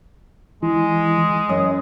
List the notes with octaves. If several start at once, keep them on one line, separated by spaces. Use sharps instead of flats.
E3 G#3
F#2 D#5